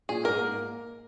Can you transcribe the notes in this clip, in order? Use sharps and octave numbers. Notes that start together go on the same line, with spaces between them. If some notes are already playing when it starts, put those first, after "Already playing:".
A#2 G#4
G#2 A#4
A#3